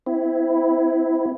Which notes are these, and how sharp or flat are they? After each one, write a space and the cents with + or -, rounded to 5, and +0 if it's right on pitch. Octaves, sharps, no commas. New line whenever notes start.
C4 -25 E4 +0